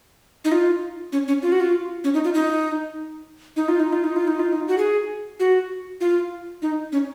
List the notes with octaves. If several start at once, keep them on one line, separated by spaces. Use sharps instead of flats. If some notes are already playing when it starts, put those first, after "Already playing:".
D#4
F4
C#4
C#4
F4
F#4
F4
C#4
D#4
F4
D#4
D#4
F4
D#4
F4
D#4
F4
D#4
F4
D#4
F#4
G#4
F#4
F4
D#4
C#4